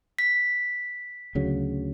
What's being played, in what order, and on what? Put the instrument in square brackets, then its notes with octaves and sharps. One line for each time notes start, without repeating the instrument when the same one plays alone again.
[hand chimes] B6
[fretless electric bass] D2 C#3 F#3